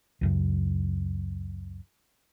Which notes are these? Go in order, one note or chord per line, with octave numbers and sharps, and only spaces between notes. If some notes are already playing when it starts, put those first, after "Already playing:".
C#2 F#2 C#3